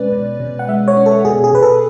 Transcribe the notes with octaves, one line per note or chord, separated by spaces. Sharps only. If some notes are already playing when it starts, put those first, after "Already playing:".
Already playing: B2 G#3 C#4 B4 D5
B2
B2
F#5
G#3 E5
C#5
C#4
A4
B2 G#4
G#4
B2 B4
A4